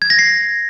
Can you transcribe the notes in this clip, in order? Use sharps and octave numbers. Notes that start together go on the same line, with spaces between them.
G#6
A#6
C7